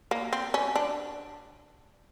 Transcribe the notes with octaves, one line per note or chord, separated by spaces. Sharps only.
A#3
C4
C#4
D4